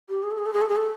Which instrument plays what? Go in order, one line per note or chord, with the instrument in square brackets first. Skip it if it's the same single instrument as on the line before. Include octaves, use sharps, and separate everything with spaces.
[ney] G4
G#4
A4
G#4
A4
G#4
A4
G#4
A4